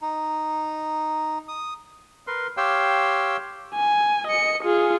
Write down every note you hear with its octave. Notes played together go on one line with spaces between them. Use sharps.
D#4
D#6
A#4 B4 C6
G4 C#5 F5 G5 C6 E6
G#5
D#5 C#7
F4 G#4